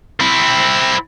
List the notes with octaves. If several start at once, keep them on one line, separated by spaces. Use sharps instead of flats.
C4 E4